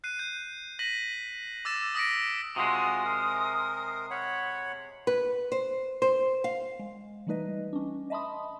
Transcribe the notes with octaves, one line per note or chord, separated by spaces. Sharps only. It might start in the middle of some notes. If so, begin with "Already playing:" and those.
F#6 C7 D#7
G6
A#6 B6 D#7 F#7
D6 E6 A6 E7
D#6 E6 A#6 B6 C#7 D7
C3 G#3 F4 F#4 C6 D#6
A#4
C#5 F#5 B5
B4
C5
C5
F5
G#3
E3 G3 A3 D#4 B4 D#5
C#4 D4
D#5 E5 A5 B5 C6 D#6